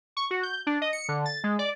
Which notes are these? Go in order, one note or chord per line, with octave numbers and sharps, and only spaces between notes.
C#6
F#4
G6
D4
D#5
C#7
D3
A6
G#3
D5